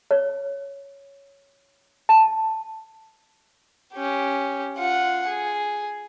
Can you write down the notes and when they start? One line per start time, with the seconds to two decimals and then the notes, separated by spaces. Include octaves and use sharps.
0.11 C#5
2.09 A5
3.94 C#4 G4
4.77 F4 F#5
5.28 G#4